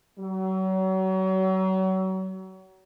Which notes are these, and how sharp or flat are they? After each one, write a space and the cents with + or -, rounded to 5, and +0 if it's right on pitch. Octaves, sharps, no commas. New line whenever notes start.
F#3 +35